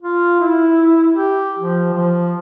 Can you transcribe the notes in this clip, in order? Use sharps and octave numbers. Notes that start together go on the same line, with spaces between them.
F4
E4
G4
F3
F3